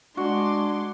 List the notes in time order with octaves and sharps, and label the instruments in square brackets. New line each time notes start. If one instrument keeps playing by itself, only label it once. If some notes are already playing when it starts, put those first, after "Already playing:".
[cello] G#3 [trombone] D4 [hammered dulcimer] F#4 [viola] C6 D6